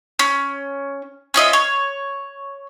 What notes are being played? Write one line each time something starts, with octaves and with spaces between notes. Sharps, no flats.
C#4
C#4 F4 D#5 E5
C#5